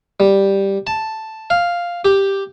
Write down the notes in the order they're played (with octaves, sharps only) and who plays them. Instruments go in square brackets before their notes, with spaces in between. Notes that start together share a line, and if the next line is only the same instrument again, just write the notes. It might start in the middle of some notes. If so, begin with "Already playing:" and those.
[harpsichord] G3
A5
F5
G4